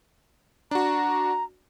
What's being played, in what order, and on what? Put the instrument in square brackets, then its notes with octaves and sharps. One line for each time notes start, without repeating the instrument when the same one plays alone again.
[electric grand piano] D4 F#4 [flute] A#5